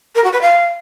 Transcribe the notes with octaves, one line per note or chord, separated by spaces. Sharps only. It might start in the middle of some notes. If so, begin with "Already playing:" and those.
A#4
F#4
B4
F5